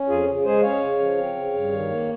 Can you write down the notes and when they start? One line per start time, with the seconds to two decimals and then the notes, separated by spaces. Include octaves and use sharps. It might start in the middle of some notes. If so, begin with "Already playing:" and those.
Already playing: C#4
0.08 F2 F4 G#4
0.27 C#3
0.44 G#3 G#4 C5
0.63 C#4 C#5 F5
0.81 C#3
0.99 F3
1.18 C4
1.35 C#3
1.53 G2
1.72 D#3
1.90 A#3